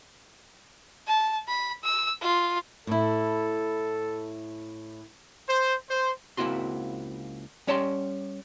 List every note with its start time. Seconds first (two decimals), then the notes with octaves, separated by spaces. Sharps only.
1.07 A5
1.48 B5
1.83 E6
2.22 F4
2.87 A2 E4 A4
5.47 C5
5.89 C5
6.37 C#2 A#3 C4 E4 F#4 C6
7.67 G3 C#4 C#5 G5 A5 C6